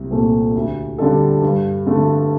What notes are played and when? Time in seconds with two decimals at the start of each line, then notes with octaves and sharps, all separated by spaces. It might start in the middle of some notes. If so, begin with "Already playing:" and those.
Already playing: C2
0.11 A#2 A3 C4
0.55 D2
0.98 D3 G3 D4 A4
1.42 G2
1.87 D3 A3